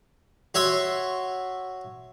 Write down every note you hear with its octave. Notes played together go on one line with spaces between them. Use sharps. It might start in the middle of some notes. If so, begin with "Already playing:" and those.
F#4 C#5 E5 C6 C#6